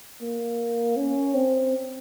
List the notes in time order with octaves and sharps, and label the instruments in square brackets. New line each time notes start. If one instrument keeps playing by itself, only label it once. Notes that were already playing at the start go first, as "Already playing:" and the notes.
[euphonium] A#3
C#4
C4